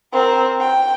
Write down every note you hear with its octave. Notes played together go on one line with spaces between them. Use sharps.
C4 A#4
G5